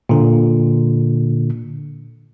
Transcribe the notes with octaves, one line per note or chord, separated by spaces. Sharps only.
A#2 D3